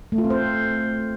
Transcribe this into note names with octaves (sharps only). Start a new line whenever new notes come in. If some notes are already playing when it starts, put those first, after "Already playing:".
A3
F4
C4
C5